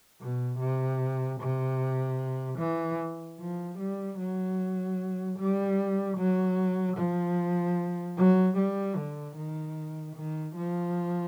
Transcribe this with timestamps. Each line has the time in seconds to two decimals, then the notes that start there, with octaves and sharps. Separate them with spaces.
0.21 B2
0.60 C3
1.40 C3
2.59 E3
3.40 F3
3.79 G3
4.19 F#3
5.39 G3
6.18 F#3
6.98 F3
8.18 F#3
8.57 G3
8.97 D3
9.36 D#3
10.16 D#3
10.56 F3